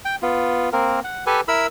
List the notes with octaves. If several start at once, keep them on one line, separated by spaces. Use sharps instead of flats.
G5
B3 F4
A#3 C4 A#4
F#5
G4 A4 B4 G#5
E4 A#4 B5 E6